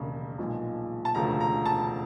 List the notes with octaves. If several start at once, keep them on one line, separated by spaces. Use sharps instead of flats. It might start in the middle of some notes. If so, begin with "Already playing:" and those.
Already playing: E1 D#2 C#3
B1 A#2 F3 G#3
A5
E1 D2 C#3 F3 A3 A#5
A#5
A5